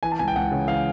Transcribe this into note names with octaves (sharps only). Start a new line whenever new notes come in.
E3 G#5
A5
C#2 G#5
G5
C#2 F#5
C#3
E3 F5